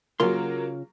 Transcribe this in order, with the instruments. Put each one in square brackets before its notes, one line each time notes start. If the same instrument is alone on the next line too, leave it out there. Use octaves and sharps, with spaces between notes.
[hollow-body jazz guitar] C#3 F4 C6 [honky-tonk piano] F#3 A#3